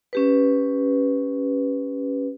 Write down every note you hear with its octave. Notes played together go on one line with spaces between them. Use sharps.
C#4 G4 B4